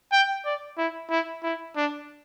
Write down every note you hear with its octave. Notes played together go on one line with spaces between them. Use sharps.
G5
D5
E4
E4
E4
D4